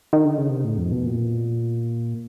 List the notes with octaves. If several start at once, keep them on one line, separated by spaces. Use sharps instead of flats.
D#3
D3
C#3
C3
A2
F2
B2
A#2